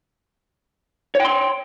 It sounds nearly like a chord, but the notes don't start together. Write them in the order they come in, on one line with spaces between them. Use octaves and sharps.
C#5 G5 C6